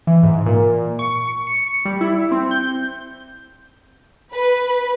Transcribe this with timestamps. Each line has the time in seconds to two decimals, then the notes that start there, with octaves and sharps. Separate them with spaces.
0.07 E3
0.23 G#2
0.46 A#2
0.99 C#6
1.47 C#7
1.85 G3
2.01 E4
2.31 C4
2.51 G6
4.34 B4